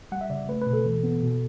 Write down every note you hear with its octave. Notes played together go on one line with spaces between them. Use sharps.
G3 F#5
E5
C#3 D5
A3 B4
B4
B2
A4
E3
B3
B2